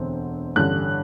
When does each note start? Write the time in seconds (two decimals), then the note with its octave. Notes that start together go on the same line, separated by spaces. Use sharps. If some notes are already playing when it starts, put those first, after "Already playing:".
Already playing: E1 D2 D3 C4
0.56 A1 G2 D3 F#6